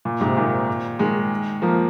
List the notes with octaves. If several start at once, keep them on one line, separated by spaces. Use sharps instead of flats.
A#2
G#2 C3
A#2 D#3
D#3 G#3
F3 A#3